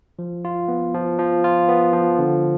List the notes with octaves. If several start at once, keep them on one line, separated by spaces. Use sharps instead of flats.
F3
F4
B3
F3
F3
F4
B3
F3
D3